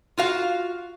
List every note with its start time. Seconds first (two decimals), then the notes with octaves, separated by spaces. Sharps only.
0.18 F4 F#4 F5